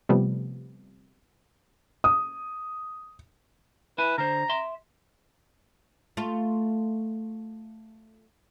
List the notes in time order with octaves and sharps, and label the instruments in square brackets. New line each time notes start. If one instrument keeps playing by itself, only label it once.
[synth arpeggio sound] C3 F3 G3 A3 B3
[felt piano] D#6
[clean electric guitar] E4 G#5 [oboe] B4
[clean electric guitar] D3 C5 [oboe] A#5
[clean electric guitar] E5 C6
[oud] A3 F4